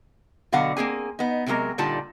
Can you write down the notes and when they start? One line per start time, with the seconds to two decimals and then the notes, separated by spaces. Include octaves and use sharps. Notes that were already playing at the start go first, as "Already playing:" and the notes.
0.52 B2 D3 F#3 F5 F#5
0.77 A#3 C4 G#4 G#5
1.19 B3 D#4
1.46 C3 F#3 G#3 D4 A#4
1.78 A#2 D3 G3 D#4 F4 A5